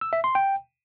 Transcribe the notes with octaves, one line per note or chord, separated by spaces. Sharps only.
E6
E5
C6
G5